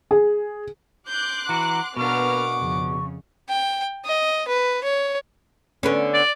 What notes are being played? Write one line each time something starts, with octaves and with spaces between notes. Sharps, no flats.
G#4
C6 D6 F#6 G6
E3 F#4 F#5 A#5
B2 A#3 B3 D4 F#5 C#6 D6 F6
F2 C#3
G5
D#5
B4
C#5
D3 B3 C#4
D5